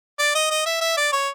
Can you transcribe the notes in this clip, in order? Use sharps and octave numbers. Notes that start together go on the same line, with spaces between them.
D5
D#5
D#5
E5
E5
D5
C#5